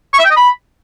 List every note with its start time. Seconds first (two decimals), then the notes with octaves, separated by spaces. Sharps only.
0.13 C#6
0.19 E5
0.25 G5
0.30 D#5
0.36 B5